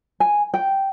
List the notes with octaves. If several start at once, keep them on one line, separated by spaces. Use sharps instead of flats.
G#5
G5